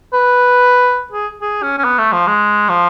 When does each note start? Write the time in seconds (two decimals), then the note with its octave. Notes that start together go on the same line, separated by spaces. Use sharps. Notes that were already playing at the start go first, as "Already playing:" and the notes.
0.13 B4
1.12 G#4
1.42 G#4
1.63 C#4
1.79 C#4
1.84 B3
1.98 A3
2.12 F3
2.27 G#3
2.69 F3